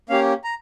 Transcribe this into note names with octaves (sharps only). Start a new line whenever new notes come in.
A#3 C#4 G4 F5
A#5